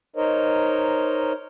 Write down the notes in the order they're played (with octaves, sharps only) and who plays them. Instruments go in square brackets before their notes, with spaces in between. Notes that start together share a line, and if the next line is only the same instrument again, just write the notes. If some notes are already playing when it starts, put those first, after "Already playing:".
[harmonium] D#4 A#4 C5 C#5 D#5